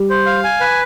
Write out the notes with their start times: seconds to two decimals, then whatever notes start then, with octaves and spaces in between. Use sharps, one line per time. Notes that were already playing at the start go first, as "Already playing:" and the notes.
Already playing: G3
0.10 C5
0.26 F5
0.44 G#5
0.61 B4